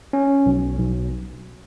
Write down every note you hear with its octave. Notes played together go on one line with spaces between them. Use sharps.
C#4
B1
B1